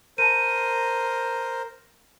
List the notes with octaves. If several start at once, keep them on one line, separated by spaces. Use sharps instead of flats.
A#4 C5 A5 D#7